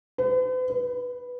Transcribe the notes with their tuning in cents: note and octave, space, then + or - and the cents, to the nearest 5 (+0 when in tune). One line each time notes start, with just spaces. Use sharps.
B4 +45
B4 +0